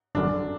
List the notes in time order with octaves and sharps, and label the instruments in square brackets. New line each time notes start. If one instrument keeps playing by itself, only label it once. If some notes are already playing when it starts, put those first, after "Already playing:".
[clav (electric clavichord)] G1 F#2 D3 [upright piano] D4